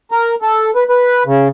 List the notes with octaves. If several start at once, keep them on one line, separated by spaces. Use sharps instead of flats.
A#4
A4
B4
B4
C#3